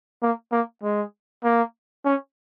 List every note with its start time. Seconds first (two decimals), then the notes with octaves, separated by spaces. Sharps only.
0.23 A#3
0.52 A#3
0.83 G#3
1.44 A#3
2.06 C#4